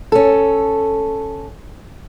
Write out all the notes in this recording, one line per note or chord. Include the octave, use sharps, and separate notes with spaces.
C#4 A4